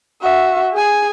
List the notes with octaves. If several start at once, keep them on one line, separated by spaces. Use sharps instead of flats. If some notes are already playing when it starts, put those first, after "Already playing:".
F#4 E5
G#4 G#5